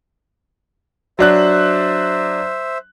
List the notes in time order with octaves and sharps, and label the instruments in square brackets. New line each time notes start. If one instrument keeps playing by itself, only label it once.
[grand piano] F#3 D4 F#6 [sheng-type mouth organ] C5 E5